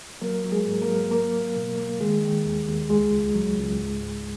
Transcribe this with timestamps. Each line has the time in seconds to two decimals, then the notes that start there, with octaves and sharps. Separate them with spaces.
0.21 F#3 A#3 A#4
0.44 F#3
0.52 G#3 G#4
0.66 G#2
0.81 A#3 A#4
0.89 F#3
1.11 A#3 A#4
1.33 A#3
1.56 B2
1.78 A#3
2.00 D#3 G#3 G#4
2.22 D#3
2.45 D#2
2.68 D#2
2.90 C#2 G#3 G#4
3.12 C#2
3.34 F#3
3.57 C#2
3.79 G#2
4.01 G#2